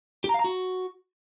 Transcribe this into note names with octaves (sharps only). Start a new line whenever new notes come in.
G4
A#5
F5
A#5
F#4